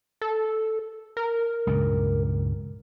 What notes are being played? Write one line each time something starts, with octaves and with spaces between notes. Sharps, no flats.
A4
A#4
C#2 G2 A#2